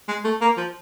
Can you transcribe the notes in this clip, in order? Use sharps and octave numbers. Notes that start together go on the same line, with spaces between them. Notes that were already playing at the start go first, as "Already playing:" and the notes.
G#3
A3
A#3
F3